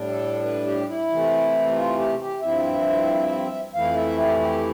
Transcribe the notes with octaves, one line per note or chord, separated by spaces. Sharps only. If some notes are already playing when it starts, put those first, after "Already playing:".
Already playing: A2 G3 D4
A4
B4
G4
E4
C3 E3 A3
F4
G4
G4
G2 F3 C4 E4 E5
F2 E3 A3 E4 F5
E5
G4
G4